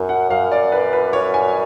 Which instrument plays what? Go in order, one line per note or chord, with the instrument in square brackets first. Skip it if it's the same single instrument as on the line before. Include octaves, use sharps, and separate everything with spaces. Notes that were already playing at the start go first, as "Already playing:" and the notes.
Already playing: [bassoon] F#2
[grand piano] F#5
[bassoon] F#2 [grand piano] F5
[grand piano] D5
B4
B4
C#5
G#5